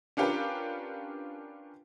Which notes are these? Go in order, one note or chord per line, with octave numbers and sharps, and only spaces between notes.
C#4 D4 F4 G4 A#4 B4